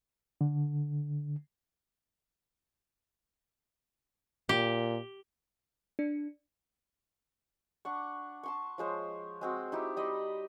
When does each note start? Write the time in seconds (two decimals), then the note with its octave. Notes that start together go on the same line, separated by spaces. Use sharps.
0.41 D3
4.49 A#2 G4
5.99 D4
7.85 D4 F#5 C#6
8.43 A5 C6 C#6
8.78 F3 G#3 C5 C#5
9.41 G#3 C4 F#4
9.72 D#4 E4 G4
9.97 G3 D#5 B5 C6